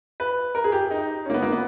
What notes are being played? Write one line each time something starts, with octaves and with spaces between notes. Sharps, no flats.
B4
A#4
G#4
G4
D#4
C#4
A#3
B3
A#3
B3